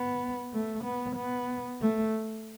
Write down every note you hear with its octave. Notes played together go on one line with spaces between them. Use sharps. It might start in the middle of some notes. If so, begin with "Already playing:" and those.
Already playing: B3
A3
B3
B3
A3